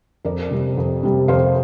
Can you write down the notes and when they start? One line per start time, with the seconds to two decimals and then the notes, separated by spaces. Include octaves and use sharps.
0.25 F2 A#4 D5
0.51 C3 G3
0.77 F2
1.03 C3 G3
1.28 F2 C5 F5